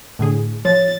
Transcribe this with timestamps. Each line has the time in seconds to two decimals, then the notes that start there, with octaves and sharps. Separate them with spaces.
0.19 A2 D3 G#4
0.65 F3 C#5 A6